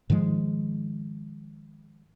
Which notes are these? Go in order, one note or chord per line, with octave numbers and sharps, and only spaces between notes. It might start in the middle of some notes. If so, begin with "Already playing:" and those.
G#2 D#3 F3 G#3